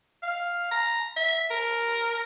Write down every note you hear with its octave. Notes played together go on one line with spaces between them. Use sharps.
F5
A#5
E5
A#4